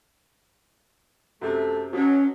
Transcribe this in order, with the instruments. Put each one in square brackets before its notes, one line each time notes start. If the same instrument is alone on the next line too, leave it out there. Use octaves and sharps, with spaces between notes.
[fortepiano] F#2 C3 [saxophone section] A3
[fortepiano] B2 [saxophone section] F#3 [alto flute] C#4